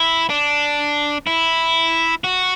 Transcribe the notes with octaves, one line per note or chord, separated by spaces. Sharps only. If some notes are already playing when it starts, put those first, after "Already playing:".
Already playing: E4
D4
E4
F#4